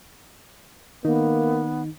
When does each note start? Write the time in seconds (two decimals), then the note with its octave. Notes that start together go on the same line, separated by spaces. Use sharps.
1.05 D#3 A#3 B3 D#4